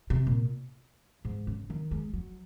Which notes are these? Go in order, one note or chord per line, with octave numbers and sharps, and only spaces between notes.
C3
A#2
G#2
C#3
D#3
G#3
F#3